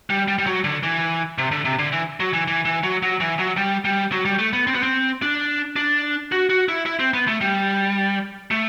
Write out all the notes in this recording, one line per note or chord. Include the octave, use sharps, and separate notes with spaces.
G3
G3
G3
F#3
D3
E3
C3
D3
C3
D3
E3
F#3
E3
E3
E3
F#3
F#3
E3
F#3
G3
G3
F#3
G3
A3
B3
C4
B3
C4
D4
D4
F#4
F#4
E4
E4
C4
B3
A3
G3
A3